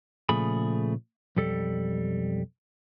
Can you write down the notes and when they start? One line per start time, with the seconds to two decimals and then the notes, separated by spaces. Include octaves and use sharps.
0.29 A#2 C#3 F3 A3 G#4 B5
1.37 B1 F2 G3 A4